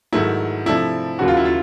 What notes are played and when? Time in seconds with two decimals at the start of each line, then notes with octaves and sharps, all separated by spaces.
0.13 G#2 D#3 F#3 A3 E4
0.66 C3 F3 A3 D4 E4
1.19 D#2 C#3 F#3 F#4
1.28 F4
1.37 E4
1.45 F4